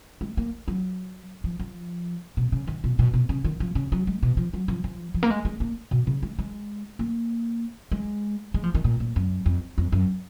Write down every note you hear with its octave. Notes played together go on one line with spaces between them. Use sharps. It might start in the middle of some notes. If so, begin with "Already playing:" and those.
G#3
A#3
F#3
F3
F3
B2
C#3
D#3
B2
B2
B2
C#3
D#3
F3
C#3
F#3
G#3
B2
F3
F#3
F3
F3
F3
A#3
G#3
G#3
A#3
B2
C#3
G#3
G#3
A#3
G#3
G#3
F3
D#3
A#2
A#2
F#2
F2
F2
F#2